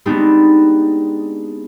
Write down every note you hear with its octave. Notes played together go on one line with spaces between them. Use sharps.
G#3 B3 C4 D4 D#4 G4